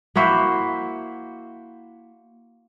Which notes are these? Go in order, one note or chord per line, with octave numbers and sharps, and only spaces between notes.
A#3 E4 F#4 C5